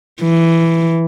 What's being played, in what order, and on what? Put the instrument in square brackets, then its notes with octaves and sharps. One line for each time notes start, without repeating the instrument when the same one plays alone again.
[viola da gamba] E3